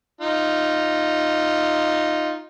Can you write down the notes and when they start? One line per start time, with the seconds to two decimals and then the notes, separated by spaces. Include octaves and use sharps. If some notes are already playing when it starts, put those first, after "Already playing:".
0.21 D#4 F4